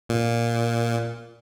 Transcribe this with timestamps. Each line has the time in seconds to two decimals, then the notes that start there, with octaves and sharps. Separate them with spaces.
0.09 A#2